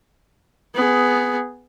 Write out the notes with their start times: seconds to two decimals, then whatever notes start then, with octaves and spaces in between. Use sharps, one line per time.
0.74 B3 G#4